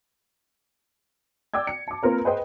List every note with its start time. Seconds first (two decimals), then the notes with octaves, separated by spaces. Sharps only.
1.54 D5 G5 D6 E6 G#6
1.67 C#7
1.88 A5 D6
2.03 A#3 C4 F4 A#4 B4
2.24 G#4 B4 C5 D#5 G5